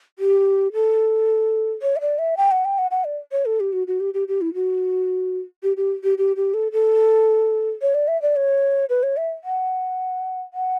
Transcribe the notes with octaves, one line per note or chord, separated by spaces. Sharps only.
G4
A4
C#5
E5
D5
E5
G5
F#5
G5
F#5
F#5
D5
C#5
A4
G4
F#4
F#4
G4
G4
G4
E4
F#4
G4
G4
G4
G4
G4
A4
A4
C#5
D5
E5
D5
C#5
B4
C#5
E5
F#5
F#5